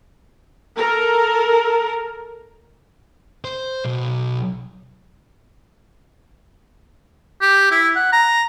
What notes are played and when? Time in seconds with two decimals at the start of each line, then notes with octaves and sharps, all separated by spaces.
0.76 A4 A#4
3.45 C5
3.85 B1
7.41 G4
7.72 E4
7.96 F#5
8.13 A#5